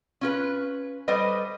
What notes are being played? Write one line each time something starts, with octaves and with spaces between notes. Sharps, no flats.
C#4 F4 B4
G3 A4 B4 C5 D#5